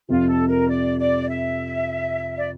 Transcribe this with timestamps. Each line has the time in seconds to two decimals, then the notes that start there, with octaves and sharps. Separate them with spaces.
0.09 F2 C3 F3 F4
0.29 A4
0.48 A#4
0.70 D5
0.99 D5
1.29 E5
2.37 D5